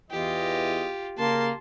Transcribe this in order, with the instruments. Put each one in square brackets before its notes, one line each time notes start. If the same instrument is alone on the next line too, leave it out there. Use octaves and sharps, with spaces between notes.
[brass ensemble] E2 E3 D#5 [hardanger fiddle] F4 G4
[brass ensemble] C#3 A#3 [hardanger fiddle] A5 C6